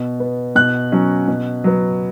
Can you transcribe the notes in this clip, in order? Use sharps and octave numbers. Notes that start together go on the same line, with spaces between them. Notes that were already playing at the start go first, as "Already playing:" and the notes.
Already playing: B2
B3
B2 F#6
F#3 C#4
B2
F#3 B3